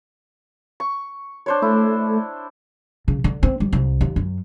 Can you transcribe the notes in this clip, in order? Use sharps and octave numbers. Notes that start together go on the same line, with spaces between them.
C#6
D4 C5 C#5
A3 E4
C#3
D3
C4
G3
C2
D#2
F#2